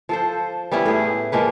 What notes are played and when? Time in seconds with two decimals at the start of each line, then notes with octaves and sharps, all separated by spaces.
0.09 F3 A4 C5
0.72 G3 B3 C#4 E4
0.86 A2 G#4
1.32 F3 G#3 A#3 B4